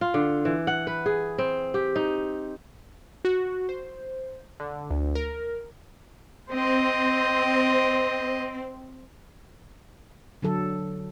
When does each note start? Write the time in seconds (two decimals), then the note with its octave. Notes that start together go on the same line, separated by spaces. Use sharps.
0.01 F4
0.14 D3
0.45 E3
0.67 F#5
0.87 B4
1.06 G#4
1.38 C4
1.74 G4
1.96 D#4
3.25 F#4
3.69 C5
4.60 D3
4.91 D2
5.15 A#4
6.53 C4 C5 D#5
10.42 D3 F#3 A4